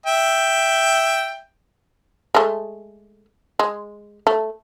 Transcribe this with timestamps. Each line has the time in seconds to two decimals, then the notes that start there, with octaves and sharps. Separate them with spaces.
0.06 E5 G5
2.35 G#3 A3
3.59 G#3
4.27 A3